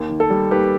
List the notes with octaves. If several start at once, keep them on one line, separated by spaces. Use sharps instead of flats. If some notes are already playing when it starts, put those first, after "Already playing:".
Already playing: D#2
D#3
A4
G3
D#2 G4 B4